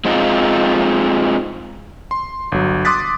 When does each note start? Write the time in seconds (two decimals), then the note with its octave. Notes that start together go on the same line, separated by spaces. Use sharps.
0.05 G#3 C4 D#4 F4
2.11 C6
2.52 G1 F#3
2.85 C6 D6 D#6 F#6 A6 B6